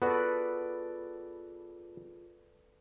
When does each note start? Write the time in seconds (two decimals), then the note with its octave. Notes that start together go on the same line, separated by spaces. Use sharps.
0.02 B3 F4 F#4 G#4 A4 B4 D5 A#6